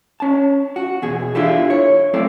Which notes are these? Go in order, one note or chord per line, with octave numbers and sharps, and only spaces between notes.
C#4 A5
F#4
E2 B2 G#4
D4 E4 F4 G4 A4
C#5
F#3 A3 C4 E4 A4 D5